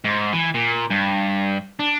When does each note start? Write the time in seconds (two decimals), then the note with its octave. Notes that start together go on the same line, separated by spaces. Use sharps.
0.05 G#2
0.33 E3
0.54 A#2
0.90 G2
1.79 D4